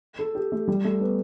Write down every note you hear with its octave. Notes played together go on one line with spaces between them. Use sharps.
A4
G4
A3
G3
A3
B3